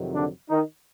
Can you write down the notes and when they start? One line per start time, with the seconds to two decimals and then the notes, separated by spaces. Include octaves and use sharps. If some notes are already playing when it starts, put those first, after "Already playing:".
Already playing: F2 C3 D#3 F#3
0.14 D3 D4
0.50 D#3 D#4